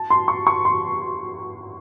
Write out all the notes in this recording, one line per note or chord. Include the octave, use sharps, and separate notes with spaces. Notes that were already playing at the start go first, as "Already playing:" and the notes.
Already playing: A5
C6
C#6
C#6
C6